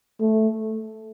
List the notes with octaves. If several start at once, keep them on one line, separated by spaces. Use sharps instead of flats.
A3